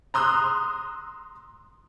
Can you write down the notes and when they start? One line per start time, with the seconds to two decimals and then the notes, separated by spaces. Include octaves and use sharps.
0.14 A#5 C6 D#6 E6 F#6